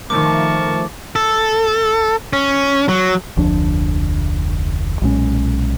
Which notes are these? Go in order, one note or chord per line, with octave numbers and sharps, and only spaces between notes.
D#3 F3 A3 A#4 A5 C#6 D6
A4
C#4
F#3
F1 D2 F3 D4
B1 A#2 G#3 C#4